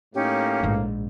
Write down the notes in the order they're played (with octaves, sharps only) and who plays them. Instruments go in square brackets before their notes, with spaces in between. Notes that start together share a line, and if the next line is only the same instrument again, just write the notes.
[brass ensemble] A2 A#3 [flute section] C#4 D#4 G4
[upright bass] A#1 G#2